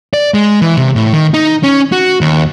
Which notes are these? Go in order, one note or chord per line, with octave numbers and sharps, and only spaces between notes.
D5
G#3
E3
C3
A2
D#3
D#4
C#4
F#4
D#2